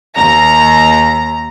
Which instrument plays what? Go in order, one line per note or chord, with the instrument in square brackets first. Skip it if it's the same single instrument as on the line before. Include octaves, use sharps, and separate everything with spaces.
[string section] D#2 A#5